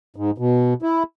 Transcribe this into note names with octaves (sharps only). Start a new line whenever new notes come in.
G#2
B2
E4